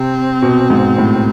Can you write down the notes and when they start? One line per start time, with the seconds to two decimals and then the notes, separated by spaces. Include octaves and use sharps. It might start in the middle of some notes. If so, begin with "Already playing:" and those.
Already playing: C3 C4
0.42 B2
0.70 G#2
0.98 A2